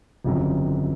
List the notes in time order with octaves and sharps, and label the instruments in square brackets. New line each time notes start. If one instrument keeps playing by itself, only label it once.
[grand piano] G1 F2 C#3 F#3